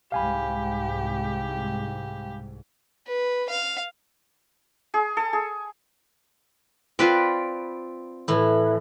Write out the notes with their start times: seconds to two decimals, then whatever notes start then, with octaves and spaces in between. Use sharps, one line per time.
0.12 C2 G#2 G4 F5 G#5 B5
3.07 B4
3.50 F5
4.94 G#4
5.17 A4
5.33 G#4
6.99 C4 F4 B4 D5 D6
8.28 A2 E3